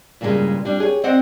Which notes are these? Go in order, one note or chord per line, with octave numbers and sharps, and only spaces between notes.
G2 A#2 C#3 E3 G3 G#3
G3 D4
G4 G#4 B4 C#5
C4 C5 D5 D#5 F#5